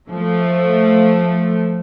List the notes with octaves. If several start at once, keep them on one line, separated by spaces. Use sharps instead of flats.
F3 A3